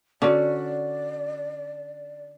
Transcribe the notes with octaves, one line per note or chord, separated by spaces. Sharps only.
D3 C#4 F#4 D5